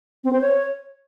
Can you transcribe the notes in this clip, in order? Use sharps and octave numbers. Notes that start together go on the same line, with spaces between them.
C4
C5
C#5